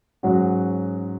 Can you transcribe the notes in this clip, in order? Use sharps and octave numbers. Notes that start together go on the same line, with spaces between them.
G#2 F#3 C#4 F#4